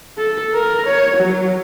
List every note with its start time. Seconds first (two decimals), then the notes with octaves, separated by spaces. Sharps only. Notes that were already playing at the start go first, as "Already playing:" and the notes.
0.18 A4
0.54 A#4
0.86 C#5
1.16 F#3